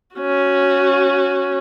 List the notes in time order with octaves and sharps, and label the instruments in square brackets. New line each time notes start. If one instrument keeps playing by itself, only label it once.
[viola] C#4 F#4